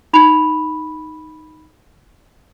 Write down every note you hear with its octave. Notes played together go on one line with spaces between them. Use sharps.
D#4 B5 F7